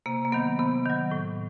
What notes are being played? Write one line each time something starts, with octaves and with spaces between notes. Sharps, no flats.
C3 A#3
A#3
D#3 F#3 B3
C3 B3
D#3 F#3
A2